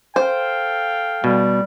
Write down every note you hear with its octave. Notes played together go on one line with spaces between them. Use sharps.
A4 C5 F5 G5
B2 G3